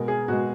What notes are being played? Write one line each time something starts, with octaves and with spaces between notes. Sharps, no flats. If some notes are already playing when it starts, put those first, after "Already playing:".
Already playing: B2 G#3 A#4
G#4
B2 G#3 F#4